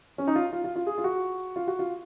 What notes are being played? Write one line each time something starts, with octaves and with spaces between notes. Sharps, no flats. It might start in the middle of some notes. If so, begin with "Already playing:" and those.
C#4
D#4
F4
F4
F4
F4
G#4
F4
F#4
F4
F#4
F4